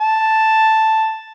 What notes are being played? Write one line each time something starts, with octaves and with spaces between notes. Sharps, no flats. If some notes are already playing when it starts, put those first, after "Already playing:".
A5